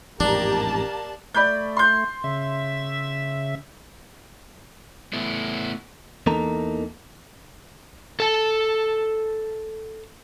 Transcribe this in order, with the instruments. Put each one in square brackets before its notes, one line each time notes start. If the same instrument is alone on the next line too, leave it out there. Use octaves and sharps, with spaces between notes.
[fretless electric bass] A1 F2 G#2 [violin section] A#3 A5 [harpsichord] D4 [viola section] G4 A#5
[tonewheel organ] A3 [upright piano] D5 B5 G6
[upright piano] C6 G6
[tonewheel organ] C#3 E5
[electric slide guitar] A3 B3 E4
[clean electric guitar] E2 E3 A#3 D#4 A4 A#5
[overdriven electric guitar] A4 A5